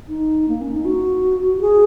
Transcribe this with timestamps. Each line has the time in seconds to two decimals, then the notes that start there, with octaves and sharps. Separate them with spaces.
0.09 D#4
0.48 A#3
0.61 C#4
0.73 D#4
0.85 F#4
1.58 F#4
1.61 G#4